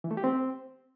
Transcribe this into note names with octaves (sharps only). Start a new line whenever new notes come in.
E3
A3
G4
C4